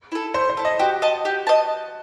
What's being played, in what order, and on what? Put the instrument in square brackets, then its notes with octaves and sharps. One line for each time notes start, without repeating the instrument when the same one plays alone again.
[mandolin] E4 A4
[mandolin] A3 [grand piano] C5
[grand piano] C5
[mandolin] E4 A4
[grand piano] D#5
[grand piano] F#4 [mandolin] G4
[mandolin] D#5 A5
G4
D#5 A5